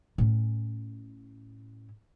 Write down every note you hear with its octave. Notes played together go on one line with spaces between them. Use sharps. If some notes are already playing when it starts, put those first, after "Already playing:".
A2 C#4